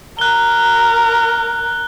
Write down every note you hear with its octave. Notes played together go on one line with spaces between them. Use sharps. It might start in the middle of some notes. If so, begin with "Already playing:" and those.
A#4 F#6 G7